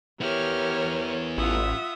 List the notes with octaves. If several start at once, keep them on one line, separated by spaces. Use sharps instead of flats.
B3 E4 G4 A#4 C#5 F6
A1 F4 E5 F#5 D#6